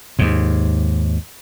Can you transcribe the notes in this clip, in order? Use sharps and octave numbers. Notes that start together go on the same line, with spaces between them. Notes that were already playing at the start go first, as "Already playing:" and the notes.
D#2 G#2